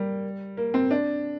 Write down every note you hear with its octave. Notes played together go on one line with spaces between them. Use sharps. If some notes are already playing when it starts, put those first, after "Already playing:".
Already playing: G3 A#3
A#3
C4
D4